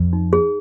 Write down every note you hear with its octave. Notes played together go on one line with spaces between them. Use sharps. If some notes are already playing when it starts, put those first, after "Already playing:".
Already playing: F2
D#4
G#4